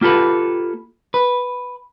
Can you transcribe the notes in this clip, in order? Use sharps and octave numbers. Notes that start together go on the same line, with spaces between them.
A#3 F4 G4 A4 B4
B4